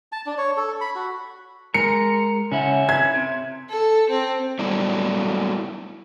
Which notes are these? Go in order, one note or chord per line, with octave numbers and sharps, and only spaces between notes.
A5
D4
C#5
A4
B5
F#4
G#3 A#4 C#7
C#3 C#4 E4 F#5
E5 G#6
C3
A4
C4
F#3 G3 A3 B3 D4 E4